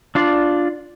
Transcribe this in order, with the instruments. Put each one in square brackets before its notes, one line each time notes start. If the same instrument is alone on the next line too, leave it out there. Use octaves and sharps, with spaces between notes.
[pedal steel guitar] D4 F4 D5